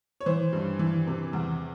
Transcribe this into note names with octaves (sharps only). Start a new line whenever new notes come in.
C#5
E3 C5
G2
E3
C3
E2